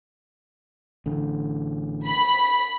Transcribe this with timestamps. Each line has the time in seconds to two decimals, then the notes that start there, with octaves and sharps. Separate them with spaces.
1.06 A1 D3
2.06 B5